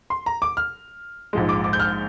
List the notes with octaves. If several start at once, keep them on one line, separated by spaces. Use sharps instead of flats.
C6
A#5
D6
F6
A#1 G#2 F3 G#3
D6
D6
G6
F6